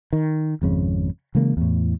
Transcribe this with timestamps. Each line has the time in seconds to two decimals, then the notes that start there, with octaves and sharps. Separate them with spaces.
0.13 D#3
0.62 G#1 F2 C#3
1.35 C#3 E3 G#3 A#3
1.57 E2 A2